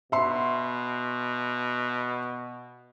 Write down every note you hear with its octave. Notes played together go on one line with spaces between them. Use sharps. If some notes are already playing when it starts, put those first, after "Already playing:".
B2 E5 C6